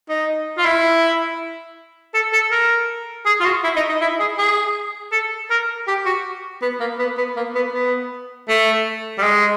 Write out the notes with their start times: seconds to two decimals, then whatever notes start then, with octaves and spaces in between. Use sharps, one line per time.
0.09 D#4
0.58 F4
0.65 E4
2.14 A4
2.33 A4
2.52 A#4
3.26 G#4
3.40 F4
3.45 F#4
3.64 E4
3.76 D#4
3.89 D#4
4.01 E4
4.20 G#4
4.38 G#4
5.12 A4
5.50 A#4
5.87 G4
6.06 F#4
6.62 B3
6.80 A#3
6.99 B3
7.18 B3
7.36 A#3
7.55 B3
7.73 B3
8.49 A3
9.18 G3
9.23 G#3